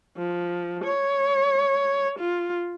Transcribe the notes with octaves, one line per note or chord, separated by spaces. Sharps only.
F3
C#5
F4